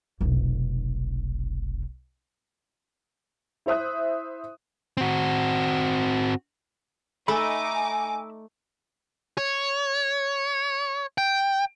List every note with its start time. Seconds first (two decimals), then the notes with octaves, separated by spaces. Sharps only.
0.21 F1 B1
3.66 E4 C5 E5 D#6 F#6
4.97 C4 F#4
7.28 A3 D#4 G#5 B5 D6 E6
9.38 C#5
11.18 G5